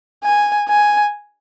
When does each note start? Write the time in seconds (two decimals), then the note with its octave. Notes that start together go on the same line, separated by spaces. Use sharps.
0.24 G#5
0.68 G#5